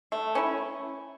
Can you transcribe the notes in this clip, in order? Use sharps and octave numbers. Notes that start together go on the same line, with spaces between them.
A3
C#4 E4